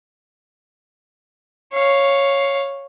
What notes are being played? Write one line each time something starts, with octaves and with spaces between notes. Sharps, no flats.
C#5 F5